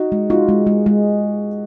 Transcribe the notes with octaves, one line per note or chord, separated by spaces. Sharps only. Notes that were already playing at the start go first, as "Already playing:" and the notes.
Already playing: D#4 F#4
G#3
D#4 F4 F#4
G#3
G#3
G#3